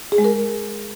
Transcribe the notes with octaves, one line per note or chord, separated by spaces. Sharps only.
G#4
G#3
A#4